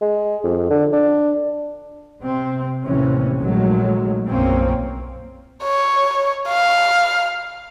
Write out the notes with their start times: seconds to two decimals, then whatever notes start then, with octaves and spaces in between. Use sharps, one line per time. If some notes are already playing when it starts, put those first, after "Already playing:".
0.01 G#3
0.44 F2
0.70 D3
0.93 D4
2.22 C3 C4
2.84 A1 D#2 C3 E3 C#4
3.40 A#1 D#3 F#3 G#3 A3
4.28 F#1 B1 A#2 A#3 C4 C#4
5.64 C#5
6.48 F5